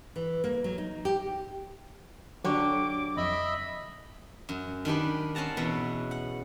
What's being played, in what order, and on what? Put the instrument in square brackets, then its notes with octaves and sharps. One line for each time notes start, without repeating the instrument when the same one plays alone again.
[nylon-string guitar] E3
A#3
F#3
D#4
G4
[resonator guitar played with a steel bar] D3 G4 C#5 [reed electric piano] F#3 D4 [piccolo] D6
[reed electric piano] F2 [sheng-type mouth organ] D#5 E5 B5
[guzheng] F#2
D#3 D4 G4 B4
C4 C#4 F#5 A5 A#5
E2 B2 B4
F#5